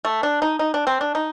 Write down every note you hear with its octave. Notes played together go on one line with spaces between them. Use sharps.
A3
D4
D#4
D#4
D4
C4
D4
D#4